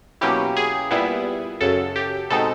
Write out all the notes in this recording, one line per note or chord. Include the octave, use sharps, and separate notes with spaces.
B2 F#3 A#3 C#4 E4 G4
G#4
A#2 G3 B3 E4
F#2 C#3 F#3 A4
G4
B2 G#3 C4 D#4 A4